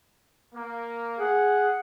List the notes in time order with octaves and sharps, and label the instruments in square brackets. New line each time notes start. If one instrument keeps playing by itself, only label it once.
[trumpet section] A#3
[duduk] G#4 [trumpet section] F#5